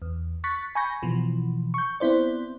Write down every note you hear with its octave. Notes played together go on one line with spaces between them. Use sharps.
E2
C#6 F#6 A6 B6
G#5 B5 C#6 G6 A#6
B2 E3 F3
C#6 G6
B3 C4 E4 C5 D5